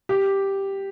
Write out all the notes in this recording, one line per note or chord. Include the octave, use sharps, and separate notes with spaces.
G4